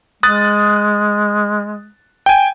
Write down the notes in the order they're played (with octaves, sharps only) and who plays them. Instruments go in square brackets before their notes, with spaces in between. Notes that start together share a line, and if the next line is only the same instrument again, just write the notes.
[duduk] G#3 [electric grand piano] D#6 F#6 A6
[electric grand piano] G5 G#5